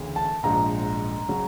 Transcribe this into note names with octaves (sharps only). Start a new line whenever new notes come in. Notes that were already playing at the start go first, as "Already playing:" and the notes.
Already playing: D2 C#3 E3
A5
A#1 G#2 F3 A#5
C#3 F#3